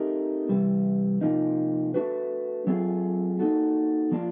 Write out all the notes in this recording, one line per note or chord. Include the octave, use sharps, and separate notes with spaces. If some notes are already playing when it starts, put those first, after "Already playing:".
Already playing: A3 C4 D#4 G4 A#4
C3 E3 G3
C3 F3 A#3 D#4
A3 D4 F#4 B4
F#3 A3 C4 F4 G#4
A#3 D#4 F#4 A4
F3 A#3 D4 F4